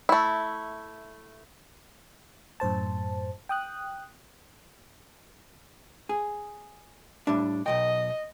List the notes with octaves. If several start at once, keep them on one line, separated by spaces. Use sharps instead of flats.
A3 E4
F#2 A2 C5 A5
G5 D#6 F#6
G#4
A2 G3 D4
B1 B2 D#5 G5